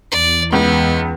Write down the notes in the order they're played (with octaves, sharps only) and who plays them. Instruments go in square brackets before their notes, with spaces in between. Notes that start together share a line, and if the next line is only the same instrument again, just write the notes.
[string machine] E2 [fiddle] D5
[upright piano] C#2 [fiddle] B3